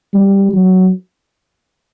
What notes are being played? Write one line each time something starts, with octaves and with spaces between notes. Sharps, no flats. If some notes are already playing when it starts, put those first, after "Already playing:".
G3
F#3